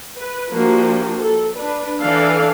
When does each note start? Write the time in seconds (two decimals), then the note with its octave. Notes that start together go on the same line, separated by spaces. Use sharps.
0.16 B4
0.51 F3 A#3 D4 F#4 G4
1.21 A4
1.57 D4 B4
2.02 E3 D4 A4 D5 F5